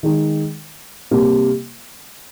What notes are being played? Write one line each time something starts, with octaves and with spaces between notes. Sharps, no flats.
D#3 G#3 D#4
C3 G3 A#3